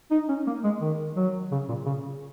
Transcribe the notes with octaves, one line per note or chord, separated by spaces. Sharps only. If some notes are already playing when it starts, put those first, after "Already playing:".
D#4
C#4
A#3
G#3
D#3
F#3
C#3
A#2
C#3